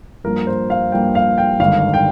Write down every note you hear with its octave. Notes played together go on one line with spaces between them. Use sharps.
G2 F3 A#3 A#4
C5
F5
G2 F3 A#3 G5
F5
G5
G#1 G2 D3 F5
G5